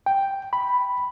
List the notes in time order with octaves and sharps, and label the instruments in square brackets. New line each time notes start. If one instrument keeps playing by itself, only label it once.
[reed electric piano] G5
B5